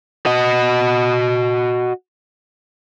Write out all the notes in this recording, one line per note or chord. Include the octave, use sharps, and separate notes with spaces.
F#4 D#5